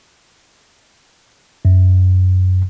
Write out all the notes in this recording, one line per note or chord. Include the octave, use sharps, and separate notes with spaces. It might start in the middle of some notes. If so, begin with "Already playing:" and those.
F#2